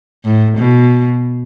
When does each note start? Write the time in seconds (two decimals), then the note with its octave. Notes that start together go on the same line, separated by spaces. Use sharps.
0.24 A2
0.58 B2